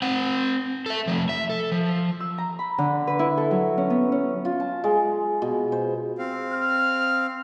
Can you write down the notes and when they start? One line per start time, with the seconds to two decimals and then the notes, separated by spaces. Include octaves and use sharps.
0.02 C4 F#5
0.86 A4 E5
1.07 F3 A3
1.29 E5
1.50 A4
1.72 F3
2.20 E6
2.38 A#5
2.59 B5
2.78 D3
3.07 B4
3.19 E4
3.37 A4
3.51 F#3
3.78 C#4
3.90 B3
4.12 C#4
4.45 F4
4.60 A5
4.84 G#3
5.42 B2
5.72 C5
6.19 C4 F5
6.53 F6